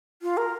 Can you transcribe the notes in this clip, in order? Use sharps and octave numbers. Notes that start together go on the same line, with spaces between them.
F4
A#4